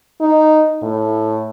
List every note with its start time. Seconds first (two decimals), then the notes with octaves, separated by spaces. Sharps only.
0.21 D#4
0.82 A2